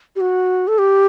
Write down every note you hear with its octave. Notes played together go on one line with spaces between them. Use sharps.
G4
F#4
A4
G4